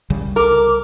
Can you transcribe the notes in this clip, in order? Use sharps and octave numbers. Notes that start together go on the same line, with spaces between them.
C2 C#3 G3
A#4 D6